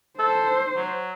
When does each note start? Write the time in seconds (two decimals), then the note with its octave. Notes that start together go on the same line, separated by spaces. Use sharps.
0.19 A4 C5
0.76 F#3